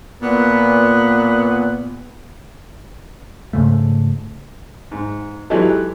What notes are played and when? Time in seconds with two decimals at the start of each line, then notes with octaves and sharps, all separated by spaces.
0.22 A#2 B3
3.53 G#2 C#3 A3
4.92 G#2
5.50 E3 F#3 G#3 D#4 G4 A4